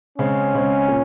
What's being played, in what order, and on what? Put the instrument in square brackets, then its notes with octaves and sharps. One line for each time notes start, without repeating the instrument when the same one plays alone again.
[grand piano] C#3 G#3 C4 [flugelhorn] C#4
[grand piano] C#3 G#3 C4
A#2